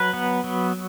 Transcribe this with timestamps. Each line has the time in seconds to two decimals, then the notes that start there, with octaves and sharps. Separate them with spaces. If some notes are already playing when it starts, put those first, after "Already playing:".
Already playing: F#3 B4
0.13 B3
0.44 F#3